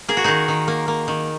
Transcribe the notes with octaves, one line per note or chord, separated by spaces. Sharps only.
A#3 G#4
F#4
D#3 D#4 G#4
D#3
A#3
A#3
D#3